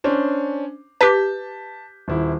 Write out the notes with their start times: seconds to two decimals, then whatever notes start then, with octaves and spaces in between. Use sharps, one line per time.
0.04 C#4 D4 C5
1.01 G4 B4 A5 G6 B6
2.08 D#1 E4